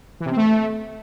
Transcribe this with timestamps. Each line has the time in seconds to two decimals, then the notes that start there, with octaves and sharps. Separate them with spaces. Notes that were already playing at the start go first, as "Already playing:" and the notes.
0.20 E3
0.26 C3
0.31 C4
0.37 A3